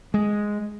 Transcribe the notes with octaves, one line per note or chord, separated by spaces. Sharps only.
G#3